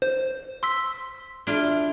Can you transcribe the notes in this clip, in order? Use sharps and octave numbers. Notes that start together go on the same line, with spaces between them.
C5
C6 E6 B6
D4 E4 F4